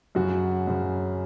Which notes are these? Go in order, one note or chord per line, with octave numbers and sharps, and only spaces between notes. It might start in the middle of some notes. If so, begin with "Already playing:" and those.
F#2 C#3 F#4
F#2 C#3